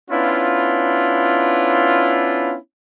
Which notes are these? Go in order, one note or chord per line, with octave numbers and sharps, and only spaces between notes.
B3 C#4 D4 E4 F4